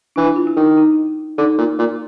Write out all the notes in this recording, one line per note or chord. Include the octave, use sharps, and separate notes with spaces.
E3 D4
E4
F4
E4
D#3 D#4
D#4
D3 D#4
A#2
A#2